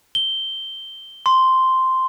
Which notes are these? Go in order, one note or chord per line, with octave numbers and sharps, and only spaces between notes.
G7
C6